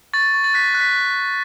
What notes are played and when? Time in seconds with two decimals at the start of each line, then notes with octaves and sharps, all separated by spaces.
0.13 C#6 A6
0.34 C#6
0.44 A6
0.54 F#6 B6
0.74 F#6
0.81 B6